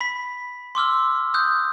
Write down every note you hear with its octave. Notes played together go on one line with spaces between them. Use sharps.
B5 B6
C6 D6 E6 F6
D#6 F#6 G6